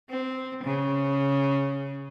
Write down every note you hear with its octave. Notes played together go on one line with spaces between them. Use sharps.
C4
C#3